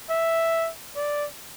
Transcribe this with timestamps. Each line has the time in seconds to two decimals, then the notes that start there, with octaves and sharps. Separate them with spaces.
0.10 E5
0.96 D5